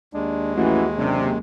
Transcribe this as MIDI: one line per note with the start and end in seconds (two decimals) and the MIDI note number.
0.14 1.38 39
0.14 1.38 56
0.14 0.54 62
0.56 0.82 33
0.56 0.83 52
0.56 0.88 66
0.98 1.40 30
0.98 1.31 48
0.98 1.25 62